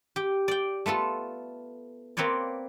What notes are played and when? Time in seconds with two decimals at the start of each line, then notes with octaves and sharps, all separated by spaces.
0.16 G4 G5
0.48 D5 G5
0.86 A3 B3 F4 A4
2.17 A#3 C4 B4 C#5 D5